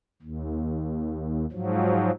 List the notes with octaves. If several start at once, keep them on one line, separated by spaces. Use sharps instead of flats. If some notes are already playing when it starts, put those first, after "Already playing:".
D#2
G#2 F3 F#3